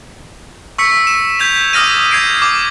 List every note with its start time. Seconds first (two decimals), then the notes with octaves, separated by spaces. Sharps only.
0.78 C#6 E6 B6 C#7
1.07 E7
1.39 G6 G#6 B6 F7
1.73 D6 D#6 F6 A#6 D#7
2.11 G#6 C7 D7
2.42 D6